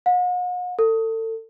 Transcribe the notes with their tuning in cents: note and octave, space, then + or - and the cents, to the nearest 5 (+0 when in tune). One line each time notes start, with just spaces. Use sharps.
F#5 -45
A4 +30